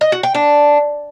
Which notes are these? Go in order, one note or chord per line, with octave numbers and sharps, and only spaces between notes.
D#5
F#4
G5
D4